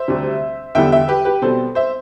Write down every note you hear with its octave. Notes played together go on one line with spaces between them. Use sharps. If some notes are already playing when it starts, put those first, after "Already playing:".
Already playing: C5 E5
D2 C3 G3
E2 D3 G3 B3 D4 E5 G5
E5 G5
G4 B4
G4 B4
B2 G3 C4 A4 C5
C5 E5